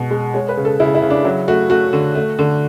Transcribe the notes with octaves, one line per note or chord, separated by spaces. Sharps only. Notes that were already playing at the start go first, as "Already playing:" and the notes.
Already playing: B2 G#3
G#3
G#3 C#5
B4
C#3
A4
C#3 E4
E4
C#3
D4
F#3 E4
A3 F#4
A3 F#4
D3
A3
D3